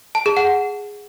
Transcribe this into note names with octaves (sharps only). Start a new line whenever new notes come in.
A5
G#4
F#5